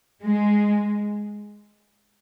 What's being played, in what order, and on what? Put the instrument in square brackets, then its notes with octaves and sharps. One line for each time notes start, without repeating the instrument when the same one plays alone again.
[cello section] G#3